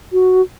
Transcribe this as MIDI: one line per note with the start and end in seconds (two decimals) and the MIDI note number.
0.13 0.42 66